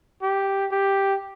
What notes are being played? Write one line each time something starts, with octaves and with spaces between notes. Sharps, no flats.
G4
G4